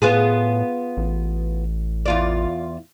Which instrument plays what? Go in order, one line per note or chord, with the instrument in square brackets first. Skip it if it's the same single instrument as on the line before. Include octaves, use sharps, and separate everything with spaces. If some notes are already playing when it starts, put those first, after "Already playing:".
[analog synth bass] A2 [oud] B3 F4 G#4
[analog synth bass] A1
[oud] E2 F4 D5